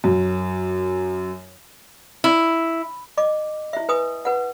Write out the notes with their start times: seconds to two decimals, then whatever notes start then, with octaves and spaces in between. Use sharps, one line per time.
0.04 F#2
2.24 E4
3.17 D#5 D6
3.73 E4 E5
3.89 B4 G#5 D#6
4.25 B4 F#5